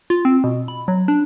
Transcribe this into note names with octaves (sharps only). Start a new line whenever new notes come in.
F4
C4
B2
B5
F#3
D4